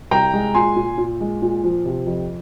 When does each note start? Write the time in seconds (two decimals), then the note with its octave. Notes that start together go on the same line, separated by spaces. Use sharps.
0.11 C2 G5 A#5
0.34 G#3
0.55 A#2 G#5 C6
0.76 A#2
0.98 A#2
1.21 G#3
1.42 A#2
1.64 F3
1.86 C3
2.07 F2